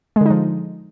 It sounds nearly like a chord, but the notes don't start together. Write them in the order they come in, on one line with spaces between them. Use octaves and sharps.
G#3 D3 D#4 F3